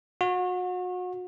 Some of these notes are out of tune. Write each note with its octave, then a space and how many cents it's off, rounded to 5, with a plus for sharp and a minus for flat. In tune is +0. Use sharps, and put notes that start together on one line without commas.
F#4 -35